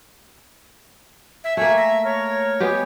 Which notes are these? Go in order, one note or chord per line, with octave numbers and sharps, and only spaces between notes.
E5
A3 A#3 E5 G#5
E5 A#5
A#4 C#5
G#3 B3 G4